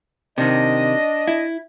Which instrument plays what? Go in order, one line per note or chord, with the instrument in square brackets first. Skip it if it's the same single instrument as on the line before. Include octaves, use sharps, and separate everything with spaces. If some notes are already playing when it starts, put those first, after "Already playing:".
[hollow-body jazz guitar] C3 D#3 [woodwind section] D4 D#5
[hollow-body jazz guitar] E4